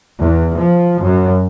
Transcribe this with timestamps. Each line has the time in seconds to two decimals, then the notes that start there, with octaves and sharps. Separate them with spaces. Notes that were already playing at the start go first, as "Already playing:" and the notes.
0.20 E2
0.61 F3
1.04 F#2